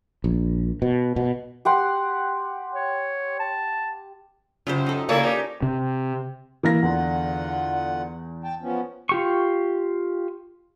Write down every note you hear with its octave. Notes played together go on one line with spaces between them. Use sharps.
A#1
B2
B2
G4 F#5 C6
C#5
A5
F#2 C#3 F4 G4 C5
D#4 A4
C#3 A#3 C#4 E4 A4 C#5 D5
D#4 G4 C5 C#5
C3
E3 A#3 A#6
E2 D3 F4 F#5
G5 A5
F3 B3 C#4
F4 G4 C#6